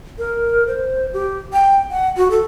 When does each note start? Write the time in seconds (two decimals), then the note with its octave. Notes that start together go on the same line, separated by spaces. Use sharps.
0.18 A#4
0.67 C5
1.13 G4
1.53 G5
1.91 F#5
2.17 F#4
2.31 A4